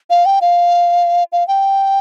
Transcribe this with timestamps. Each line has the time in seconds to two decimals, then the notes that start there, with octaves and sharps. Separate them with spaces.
0.10 F5
0.26 G5
0.41 F5
1.32 F5
1.48 G5